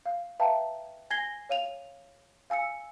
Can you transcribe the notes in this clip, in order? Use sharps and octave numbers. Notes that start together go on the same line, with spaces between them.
F5
B4 E5 F5 G5 A5 A#5
G#5 G#6 A#6 C7 G7
C#5 F5 D#7 F7
F5 G#5 E6 C#7